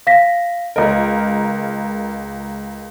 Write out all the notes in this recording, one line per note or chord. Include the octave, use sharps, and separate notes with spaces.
F5 A#6 B6
C#2 A#4 D#5